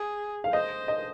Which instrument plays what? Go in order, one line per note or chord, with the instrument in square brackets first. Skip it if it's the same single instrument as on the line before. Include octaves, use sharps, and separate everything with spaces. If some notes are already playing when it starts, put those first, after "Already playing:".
Already playing: [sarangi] G#4
[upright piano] F5
[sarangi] C5 [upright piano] D#5
[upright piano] D#5